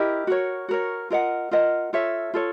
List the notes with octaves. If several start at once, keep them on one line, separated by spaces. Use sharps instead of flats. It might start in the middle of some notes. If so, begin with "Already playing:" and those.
Already playing: E4 G4 A#4 D#5
F#4 A#4 C#5
F#4 A#4 C#5
F4 A#4 D#5 F#5
F4 A#4 D#5 F#5
F4 A4 C#5 E5
F4 A4 C#5